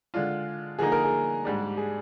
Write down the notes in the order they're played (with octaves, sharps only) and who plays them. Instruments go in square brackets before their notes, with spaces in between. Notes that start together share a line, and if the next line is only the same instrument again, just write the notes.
[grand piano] D3 G#3 D4 F4
[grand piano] D3 F3 A#3 D#4 [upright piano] G#4
[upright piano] A#4
G#4
[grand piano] G#2 G3 D4 [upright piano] G#4
[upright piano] G4
G#4